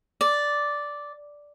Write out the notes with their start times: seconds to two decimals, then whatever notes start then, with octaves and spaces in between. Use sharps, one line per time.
0.21 D5